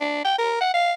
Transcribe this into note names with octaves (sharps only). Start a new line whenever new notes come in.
D4
G5
A#4
F#5
F5